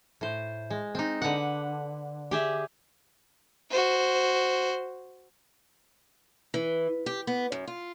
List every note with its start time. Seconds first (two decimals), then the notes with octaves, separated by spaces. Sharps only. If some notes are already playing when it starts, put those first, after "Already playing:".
0.21 A2 C5
0.70 G#3
0.95 C4 D#4
1.22 D3 B4 F#5
2.31 G4 G#4 E5
3.70 F#4 C5
6.54 E3
7.06 G4
7.27 B3
7.52 F#2
7.67 F4